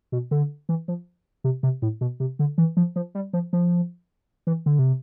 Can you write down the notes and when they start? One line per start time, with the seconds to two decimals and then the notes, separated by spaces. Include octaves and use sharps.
0.12 B2
0.31 D3
0.69 E3
0.88 F3
1.44 C3
1.63 C3
1.82 A2
2.01 B2
2.20 C3
2.39 D3
2.58 E3
2.77 F3
2.96 F3
3.15 G3
3.33 F3
3.53 F3
4.47 E3
4.66 D3
4.79 C3